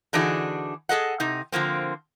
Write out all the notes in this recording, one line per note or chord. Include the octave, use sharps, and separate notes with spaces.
D3 E3 D4 D#4 F#4 G#4
G#4 A4 D#5 F#5
C3 D#4
D3 F3 A#3 C4